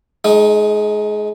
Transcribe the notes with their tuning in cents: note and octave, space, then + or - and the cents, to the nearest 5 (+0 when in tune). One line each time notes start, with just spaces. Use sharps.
G#3 +25 D#4 -15